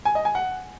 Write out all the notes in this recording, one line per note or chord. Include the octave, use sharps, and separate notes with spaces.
G#5
D#5
G#5
F#5